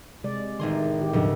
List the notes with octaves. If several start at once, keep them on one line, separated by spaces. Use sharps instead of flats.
C3 G#3 D5
A1 D#3 D#4 G#4 C6
D#3 G4
D#1 C#2 G#2 F3 D4 A4